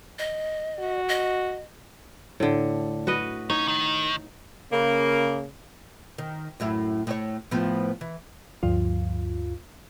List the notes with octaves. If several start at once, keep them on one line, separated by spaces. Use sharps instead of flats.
D#5
F#4
D#5
A2 D3
F#4 B4 D#5
C#4 D#4
D#3
C#3 A#3
D#3
F#2 A2 E4
A2 C#5
A2 F3 B3
E3
D2 G2 F3 F4